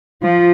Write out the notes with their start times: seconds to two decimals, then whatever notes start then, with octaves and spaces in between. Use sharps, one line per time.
0.23 F3